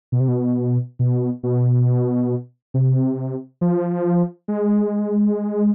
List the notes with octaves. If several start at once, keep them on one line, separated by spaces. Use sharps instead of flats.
B2
C3
B2
B2
B2
C3
F3
G#3